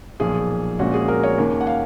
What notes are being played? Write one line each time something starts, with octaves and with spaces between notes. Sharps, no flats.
B1 A#2 F3 G#4
A#1 A#2 G#3 C#4 F#4
G#4
A#4
C#5
D#2 D#3 A#3 C#4
F#5
F5